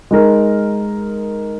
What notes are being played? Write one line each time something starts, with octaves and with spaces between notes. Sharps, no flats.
G#3 D#4 A#4